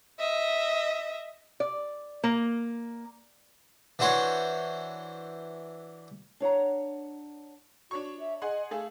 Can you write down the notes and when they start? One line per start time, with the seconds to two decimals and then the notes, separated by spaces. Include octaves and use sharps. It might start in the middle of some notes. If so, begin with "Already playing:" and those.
0.19 D#5 E5
1.60 D5
2.24 A#3
3.99 E3 D4 F#4 C5 C#5
6.40 D4 C#5 F#5 A#5
7.91 D4 F#4 C#5 C#6
8.19 E5
8.42 G#4 D#5 F#5 C6
8.71 A3 G#4 A4 F5